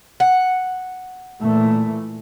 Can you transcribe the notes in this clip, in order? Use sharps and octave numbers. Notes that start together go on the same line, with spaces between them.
F#5
A#2 E3 A3